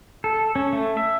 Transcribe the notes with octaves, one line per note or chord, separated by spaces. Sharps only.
A4
C#4
A3
E5